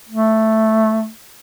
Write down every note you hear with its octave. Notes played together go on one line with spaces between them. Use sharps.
A3